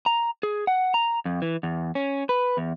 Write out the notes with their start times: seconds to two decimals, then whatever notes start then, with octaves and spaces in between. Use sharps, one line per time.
0.06 A#5
0.43 G#4
0.67 F#5
0.94 A#5
1.25 F2
1.42 E3
1.63 E2
1.95 C#4
2.29 B4
2.57 E2